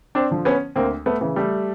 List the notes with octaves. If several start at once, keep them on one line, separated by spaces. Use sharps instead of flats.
C4 D4
D3 F3
B3 C#4
D2 A#3 C4
A3 B3
C#3 E3
G3 A3